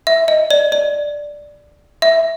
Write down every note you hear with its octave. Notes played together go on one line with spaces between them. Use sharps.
E5
D#5
D5
D5
E5